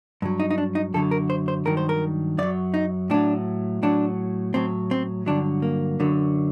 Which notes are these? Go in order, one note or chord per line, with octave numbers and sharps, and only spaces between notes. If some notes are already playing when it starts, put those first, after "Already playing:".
G2 F#3
D#4
D#4
D4
D#4
F#2 D3 F#3 A4
A#4
C5
C5
G2 D#3 F#3 A#4
C5
A#4
F#2 F#3 D5
D#4
A2 F#3 D4
A2 F#3 D4
A2 F#3 C4
C4
G2 D3 F#3 D4
A#3
F#2 D3 F#3